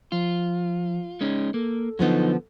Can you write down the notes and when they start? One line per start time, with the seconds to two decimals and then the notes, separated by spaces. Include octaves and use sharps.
0.12 F3 F4
1.21 G#3 C#4 D#4
1.54 A#3 A4
1.99 D3 F3 F#3 B3 D#4